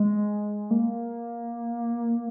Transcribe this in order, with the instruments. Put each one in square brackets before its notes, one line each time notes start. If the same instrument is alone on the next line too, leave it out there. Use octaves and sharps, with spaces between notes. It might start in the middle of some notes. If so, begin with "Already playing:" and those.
Already playing: [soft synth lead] G#3
A#3